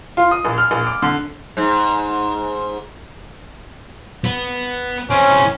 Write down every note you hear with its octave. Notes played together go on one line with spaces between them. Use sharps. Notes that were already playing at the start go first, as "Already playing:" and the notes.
F4
D#6
A#1
F6
A#1
D6
D3
G#2
B3
E3 C4 C#4